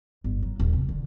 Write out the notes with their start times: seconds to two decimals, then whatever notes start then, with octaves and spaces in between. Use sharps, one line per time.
0.24 G1
0.43 F#3
0.60 D#1
0.73 C3
0.89 D3